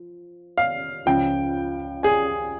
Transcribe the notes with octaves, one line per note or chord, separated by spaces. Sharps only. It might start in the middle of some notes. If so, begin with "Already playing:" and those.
Already playing: F3
F5
C#2 C#3 F3 G5
G#4 G#5